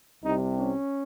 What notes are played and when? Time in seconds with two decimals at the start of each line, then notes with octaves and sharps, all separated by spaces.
0.23 C2 C3 G3 D#4
0.59 C#4